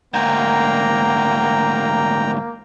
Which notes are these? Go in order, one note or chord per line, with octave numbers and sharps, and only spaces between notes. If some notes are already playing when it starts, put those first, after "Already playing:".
D2 G#2 A#3 G5 A#5